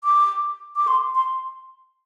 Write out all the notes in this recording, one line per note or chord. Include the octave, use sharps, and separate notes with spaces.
D6
D6
C6
C6